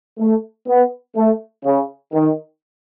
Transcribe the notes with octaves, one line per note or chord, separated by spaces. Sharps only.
A3
B3
A3
C#3
D#3